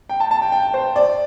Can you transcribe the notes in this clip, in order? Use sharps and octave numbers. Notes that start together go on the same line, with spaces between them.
G5
A5
A5
G5
G5
C5
D5